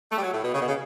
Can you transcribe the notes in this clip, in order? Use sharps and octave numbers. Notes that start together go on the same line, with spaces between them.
A3
G3
F#3
A2
B2
C#3
B2
C#3